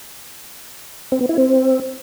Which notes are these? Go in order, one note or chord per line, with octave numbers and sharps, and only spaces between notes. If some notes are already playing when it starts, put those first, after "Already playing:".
C4
B3
E4
C4